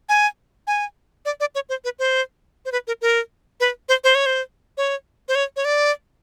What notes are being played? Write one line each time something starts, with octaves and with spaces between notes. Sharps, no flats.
G#5
G#5
D5
D5
C#5
C5
B4
C5
C5
B4
A#4
A#4
B4
C5
C5
C#5
C5
C#5
C5
C#5
C#5
D5